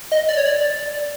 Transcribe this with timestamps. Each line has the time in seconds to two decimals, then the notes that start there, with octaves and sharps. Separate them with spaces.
0.12 D#5
0.29 D5
0.37 C#5
0.46 D5